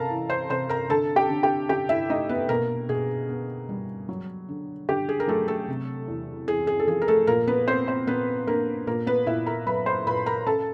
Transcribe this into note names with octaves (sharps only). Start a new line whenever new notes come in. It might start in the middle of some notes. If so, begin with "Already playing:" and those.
Already playing: C3 A4 A#4 F5 A5 A#5
E3
C5 C6
C3 C5 C6
A#4 A#5
D3 A4 A5
G4 G5
D3
G4 G5
D3 G4 G5
E4 E5
A3 D#4 D#5
B3 B4
B2 A#3 A#4
B2 G#4
B3
G3
F#3
D3
D3 G4
G#4
A#4
F#3 A3 A4
A3 A4
C3
E2
E2 G#4
G#4
A4
F3 G#4
A#4
A3 A4
A#2 A#3 A#4
B3 B4
A#3 C4 C5
C4 C5
A#2 B3 B4
A#3 D4 A#4
A#2 A#3 A#4
B3 B4
A#2 E4 E5
A#4 A#5
F#3 B4 B5
C5 C6
A#2 B4 B5
A#4 A#5
C#4 A4 A5